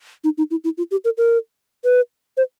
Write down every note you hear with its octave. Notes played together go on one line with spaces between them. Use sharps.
D#4
D#4
E4
E4
F4
G4
A#4
A#4
B4
C5